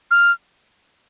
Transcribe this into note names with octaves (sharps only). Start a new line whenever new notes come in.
F6